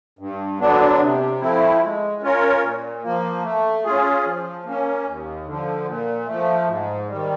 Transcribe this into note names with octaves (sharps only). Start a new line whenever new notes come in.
G2
D3 F#3 B3 D4
C3
F3 A3 C4 E4
G#3
C#4 F4 A#4 C#5
A#2
F3 A#3
A3
C#4 F4 G#4
F3
A#3 C#4
D#2
D3 F3
A#2
F3 A3
G#2
D#3 G3